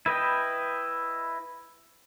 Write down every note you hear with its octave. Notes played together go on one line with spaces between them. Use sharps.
E4 B4 D#5 G5